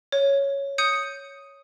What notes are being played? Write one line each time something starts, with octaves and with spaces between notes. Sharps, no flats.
C#5
D#6 G6 C#7 D#7